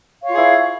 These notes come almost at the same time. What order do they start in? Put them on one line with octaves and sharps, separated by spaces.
F5 C#5 F4 G#4 E4